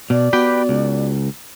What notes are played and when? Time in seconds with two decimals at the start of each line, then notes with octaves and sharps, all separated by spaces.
0.10 B2 D5
0.33 B3 F#4 G4 B4 G5
0.69 C#2